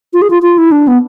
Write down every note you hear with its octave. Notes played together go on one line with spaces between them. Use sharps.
F4
G#4
F4
F4
E4
D4
B3